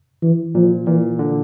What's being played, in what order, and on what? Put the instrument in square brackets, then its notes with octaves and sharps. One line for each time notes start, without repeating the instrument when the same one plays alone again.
[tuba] E3
[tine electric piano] A#2 [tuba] F3
[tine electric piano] A#2 [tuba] E3
[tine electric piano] D3